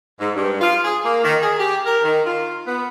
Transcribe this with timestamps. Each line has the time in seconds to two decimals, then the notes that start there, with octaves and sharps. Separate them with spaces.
0.20 G#2
0.36 G2
0.61 F4
0.85 G#4
1.05 A#3
1.25 D#3
1.43 G#4
1.60 G4
1.86 A#4
2.04 D#3
2.27 F4
2.67 B3